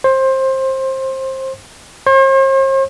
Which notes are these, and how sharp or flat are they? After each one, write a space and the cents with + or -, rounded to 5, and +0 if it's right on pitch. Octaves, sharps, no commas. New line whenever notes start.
C5 +20
C5 +45